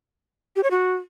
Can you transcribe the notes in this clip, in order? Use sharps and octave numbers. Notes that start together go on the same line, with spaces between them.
G4
C#5
F#4